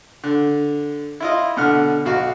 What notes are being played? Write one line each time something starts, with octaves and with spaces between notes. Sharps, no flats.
D3
E4 F4 D#5
B2 D3 F#5 F6
B1 F#4 F5